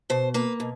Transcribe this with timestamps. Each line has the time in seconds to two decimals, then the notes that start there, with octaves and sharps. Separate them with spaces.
0.10 B2 C5
0.34 A#3 B4
0.60 B2